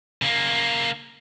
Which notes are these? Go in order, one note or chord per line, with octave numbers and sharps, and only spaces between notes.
C#3 A#3